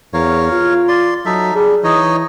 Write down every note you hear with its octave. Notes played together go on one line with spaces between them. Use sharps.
E2 A#4 C#5 F5
F4
D5 C6
F#3 D#4 A4 E5
G3 D4 G#4
E3 D#4 C#5 D#5